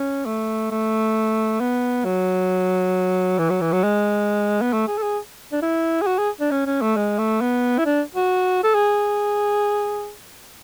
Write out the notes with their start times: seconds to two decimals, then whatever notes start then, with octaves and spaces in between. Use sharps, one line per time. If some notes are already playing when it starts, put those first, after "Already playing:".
Already playing: C#4
0.26 A3
0.71 A3
1.60 B3
2.05 F#3
3.38 E3
3.50 F#3
3.61 E3
3.72 F#3
3.84 G#3
4.61 B3
4.73 A3
4.88 G#4
4.98 A4
5.03 G#4
5.52 D4
5.62 E4
6.02 G#4
6.07 F#4
6.18 G#4
6.40 D4
6.51 C#4
6.66 C#4
6.81 A3
6.96 G#3
7.18 A3
7.41 B3
7.78 E4
7.86 D4
8.15 F#4
8.63 A4
8.75 G#4